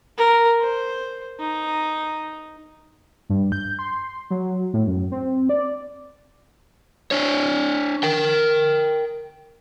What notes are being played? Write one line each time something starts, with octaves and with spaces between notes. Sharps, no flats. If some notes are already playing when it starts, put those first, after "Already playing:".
A#4
C5
D#4
G2
G6
C6
F#3
A2
F#2
C4
D5
D4 C#5
A#4 G5